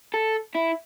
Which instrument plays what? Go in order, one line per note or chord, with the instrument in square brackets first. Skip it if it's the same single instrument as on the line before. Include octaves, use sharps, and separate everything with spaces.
[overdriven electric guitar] A4
E4